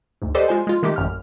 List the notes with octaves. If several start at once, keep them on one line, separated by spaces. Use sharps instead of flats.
D2 G#2
G4 A4 B4 C5 D5 D#5
G#3 F4 C5 G#5
G#3 F4
D#3 G#3 A3 G4
A1 F#2 F6